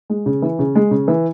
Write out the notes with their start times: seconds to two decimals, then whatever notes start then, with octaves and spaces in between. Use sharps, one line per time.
0.10 G#3
0.26 C#3
0.42 E3
0.59 C#3
0.75 G#3
0.91 C#3
1.08 E3